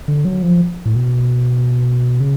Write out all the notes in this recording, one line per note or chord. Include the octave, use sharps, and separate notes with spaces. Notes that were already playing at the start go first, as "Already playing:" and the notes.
D3
F#3
F3
A2
B2
C#3